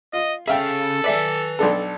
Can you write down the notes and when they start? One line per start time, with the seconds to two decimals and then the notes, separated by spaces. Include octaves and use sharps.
0.13 F4 D#5
0.48 C#4 G#4 A4 E5 F5 G5
1.04 B4 D5 E5 G#5
1.59 B1 D4 A4